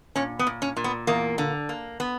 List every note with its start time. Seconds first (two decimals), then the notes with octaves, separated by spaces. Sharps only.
0.16 A#2 C#4
0.39 B3
0.47 A#2
0.62 C#4
0.77 A#2
0.84 B3
1.07 E2 A#3
1.38 D3
1.69 A#3
2.00 B3